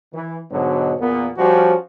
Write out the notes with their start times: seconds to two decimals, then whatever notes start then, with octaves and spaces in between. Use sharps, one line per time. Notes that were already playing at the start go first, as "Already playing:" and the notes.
0.12 E3
0.50 G#2 B2 D3 F#3
0.98 E2 A#2 A#3 B3
1.37 F3 G3 C#4 F#4